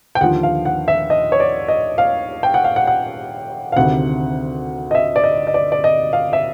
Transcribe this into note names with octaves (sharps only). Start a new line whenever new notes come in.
G5
D#2 D3 F3 F#5
F5
F#5
E5
D#5
C#5
D5
D#5
F5
G5
F#5
F5
F#5
F#5
F5
D2 C3 D#3 F#5
D#5
E5
D5
D#5
D#5
D5
D5
D#5
F5
E5